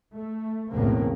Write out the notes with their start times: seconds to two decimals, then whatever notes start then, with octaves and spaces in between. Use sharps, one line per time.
0.15 A3
0.71 B1 E2 A2 C#3 A#3 C4